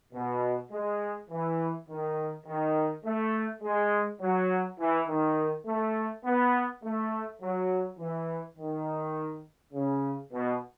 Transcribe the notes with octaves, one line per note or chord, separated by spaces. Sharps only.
B2
G#3
E3
D#3
D#3
A3
G#3
F#3
E3
D#3
A3
B3
A3
F#3
E3
D#3
C#3
B2